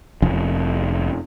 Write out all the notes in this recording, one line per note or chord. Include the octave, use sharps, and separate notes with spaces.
F1 F3 C#4